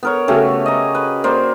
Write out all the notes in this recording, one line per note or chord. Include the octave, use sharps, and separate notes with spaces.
B3 A#4 C#5
C#3 A3 F#4 G4
D#5 A#5
B4
A#3 C5 D5